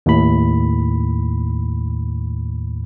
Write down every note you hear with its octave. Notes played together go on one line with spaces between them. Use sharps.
D#2 A2 B5